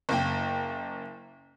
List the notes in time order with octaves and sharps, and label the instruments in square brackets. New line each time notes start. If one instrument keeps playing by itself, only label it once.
[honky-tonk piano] F#1 A#3 G5